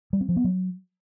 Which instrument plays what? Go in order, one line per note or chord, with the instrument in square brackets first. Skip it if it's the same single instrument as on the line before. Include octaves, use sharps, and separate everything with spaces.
[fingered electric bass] G3
C4
F3
B3
F#3